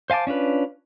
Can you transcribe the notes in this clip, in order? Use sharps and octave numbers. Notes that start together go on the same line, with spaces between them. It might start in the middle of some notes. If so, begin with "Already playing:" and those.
C5 F5 G#5 A5 D6
C#4 D4 F4 B4